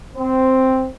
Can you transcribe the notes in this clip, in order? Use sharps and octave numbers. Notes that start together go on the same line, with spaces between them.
C4